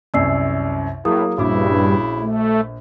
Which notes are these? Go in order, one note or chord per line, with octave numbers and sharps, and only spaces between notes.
C2 F#2 D5 E6 C7
A2 F#3 A#3 E4 G#4 D#6
A#1 G2 C#3 E4 F#4 D6
A3